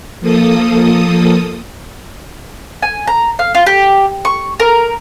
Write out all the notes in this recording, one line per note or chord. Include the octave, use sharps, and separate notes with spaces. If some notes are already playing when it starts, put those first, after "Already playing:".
F3 A#3 A4 D#6
G#5
A#5
F5
F4
G4
C#6
A#4